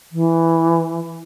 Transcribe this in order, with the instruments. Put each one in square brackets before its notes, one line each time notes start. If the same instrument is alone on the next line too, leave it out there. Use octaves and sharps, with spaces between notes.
[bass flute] E3